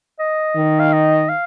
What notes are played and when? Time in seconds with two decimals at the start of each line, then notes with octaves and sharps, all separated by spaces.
0.19 D#5
0.56 D#3
0.80 F5
0.93 D#5
1.29 F5